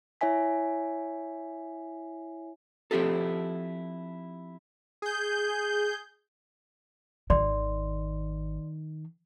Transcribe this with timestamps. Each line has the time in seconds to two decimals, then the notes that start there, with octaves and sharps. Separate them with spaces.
0.21 E4 C#5 E5 G#5 B6
2.91 F3 C4 E4 G4 A4
5.02 G#4 G6
7.30 G#1 D#3 D5 C6